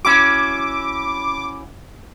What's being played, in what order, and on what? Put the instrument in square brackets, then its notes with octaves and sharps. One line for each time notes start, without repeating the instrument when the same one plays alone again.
[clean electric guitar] C#4 E4 F#4 [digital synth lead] D6